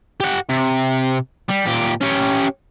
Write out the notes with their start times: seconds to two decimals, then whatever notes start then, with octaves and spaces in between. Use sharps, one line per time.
0.20 G4 F#5
0.49 C3
1.50 G3
1.67 A#2 G4
2.01 C#4 G4